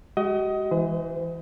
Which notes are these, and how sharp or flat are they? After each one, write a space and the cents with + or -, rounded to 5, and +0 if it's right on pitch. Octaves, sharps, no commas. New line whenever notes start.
G#3 -15 F#4 +40 D#5 +20
E3 +0 C5 -40